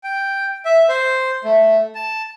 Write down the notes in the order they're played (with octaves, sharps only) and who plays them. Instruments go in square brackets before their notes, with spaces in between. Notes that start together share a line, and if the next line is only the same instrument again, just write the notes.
[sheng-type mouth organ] G5
E5
C5
A3
A5